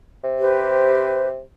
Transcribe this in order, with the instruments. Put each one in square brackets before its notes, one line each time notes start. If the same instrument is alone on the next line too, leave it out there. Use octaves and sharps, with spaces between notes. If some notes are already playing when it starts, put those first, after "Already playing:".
[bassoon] C3
[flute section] G4 B4 C5